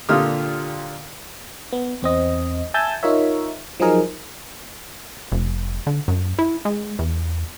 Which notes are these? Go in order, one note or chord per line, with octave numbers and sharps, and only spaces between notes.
A#2 D3 F4 G4 D#6 F6
B3
E2 C4 D#5
E5 G#5 A5 E6 G6 A6
D#4 F4 A#4 C#5 E5
F3 F#3 D#4 G#4 A#4
F1
D3
F#2
E4
G#3
E2